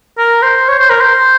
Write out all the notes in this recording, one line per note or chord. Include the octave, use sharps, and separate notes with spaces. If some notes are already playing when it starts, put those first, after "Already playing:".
A#4
C5
C#5
C5
A#4
C5